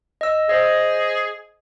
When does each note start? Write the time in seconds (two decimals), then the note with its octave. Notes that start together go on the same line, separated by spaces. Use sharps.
0.21 D#5 E6
0.49 G#4 C5 D#5